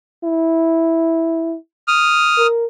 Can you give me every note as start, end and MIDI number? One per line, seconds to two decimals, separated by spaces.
0.24 1.56 64
1.88 2.47 87
1.88 2.47 89
2.38 2.66 70